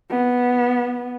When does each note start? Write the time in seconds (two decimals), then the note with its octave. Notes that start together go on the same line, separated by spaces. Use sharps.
0.10 B3